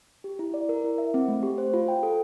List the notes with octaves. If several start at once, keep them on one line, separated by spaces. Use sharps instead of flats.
G4
E4
D5
A#4
E4
E5
C4
A3
G4
C5
F4
G5
A4